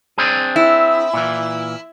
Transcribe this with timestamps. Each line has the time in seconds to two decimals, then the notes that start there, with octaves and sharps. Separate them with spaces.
0.18 C4 D4 G#4
0.56 E4
1.14 A#2 E3